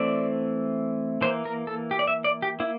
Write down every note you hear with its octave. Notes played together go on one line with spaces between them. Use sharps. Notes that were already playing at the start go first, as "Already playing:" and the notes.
Already playing: E3 A3 C4 D5
E3 A#3 C5
A#4
A4
G4
D5
E5
D5
G4
A#3 E4